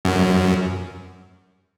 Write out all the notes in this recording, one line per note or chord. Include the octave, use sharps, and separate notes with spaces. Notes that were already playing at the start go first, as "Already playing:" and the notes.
F#2